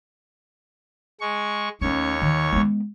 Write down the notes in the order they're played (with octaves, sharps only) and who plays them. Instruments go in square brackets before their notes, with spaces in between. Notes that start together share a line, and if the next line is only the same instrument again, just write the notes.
[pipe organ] G#3 C#6
[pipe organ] D#2 C#5 C#6 [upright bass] A3 C#4
[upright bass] D#3
G#3 B3